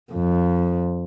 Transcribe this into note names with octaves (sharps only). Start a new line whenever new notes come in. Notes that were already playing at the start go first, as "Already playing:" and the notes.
F2